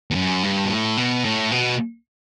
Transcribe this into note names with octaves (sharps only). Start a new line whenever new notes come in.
E2
F#2
G2
B2
A2
B2
A2
B2